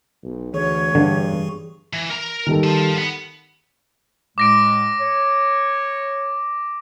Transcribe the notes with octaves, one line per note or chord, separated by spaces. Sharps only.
B1
D2 E3 G#4 C#5 C#6
G2 D3
E3
A#4 A#5
D#3 G3 A4
F4 A5
B3
A2 G#3 D6 A#6 D7
C#5